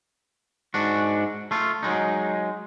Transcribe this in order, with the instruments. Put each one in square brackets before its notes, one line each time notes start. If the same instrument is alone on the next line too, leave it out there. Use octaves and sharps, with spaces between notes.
[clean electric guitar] G#2 D4 F#4
A3 F4
F#3 G#3 D#4